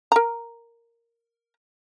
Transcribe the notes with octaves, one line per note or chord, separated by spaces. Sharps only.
A#4 A#5